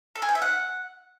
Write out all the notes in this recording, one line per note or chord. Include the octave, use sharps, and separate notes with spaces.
A4
G#4
G5
E5
F#5